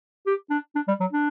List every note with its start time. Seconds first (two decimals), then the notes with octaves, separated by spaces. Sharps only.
0.27 G4
0.50 D4
0.75 D4
0.88 G3
1.00 F#3
1.13 D4